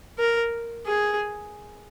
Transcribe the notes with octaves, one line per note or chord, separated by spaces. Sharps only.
A#4
G#4